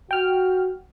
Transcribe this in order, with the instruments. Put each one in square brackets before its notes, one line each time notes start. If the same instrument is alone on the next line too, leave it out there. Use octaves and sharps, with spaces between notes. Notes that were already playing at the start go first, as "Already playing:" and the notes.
[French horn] F#4 [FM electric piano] G5 F6